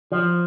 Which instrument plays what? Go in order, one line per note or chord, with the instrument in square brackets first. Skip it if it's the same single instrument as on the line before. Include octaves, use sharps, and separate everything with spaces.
[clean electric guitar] F3